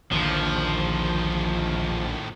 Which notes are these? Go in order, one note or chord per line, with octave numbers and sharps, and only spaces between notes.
A#1 D#2 A2 D3 D#3 F3